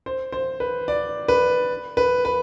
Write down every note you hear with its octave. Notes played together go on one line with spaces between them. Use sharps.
C5
C5
B4
D5
B4
B4
B4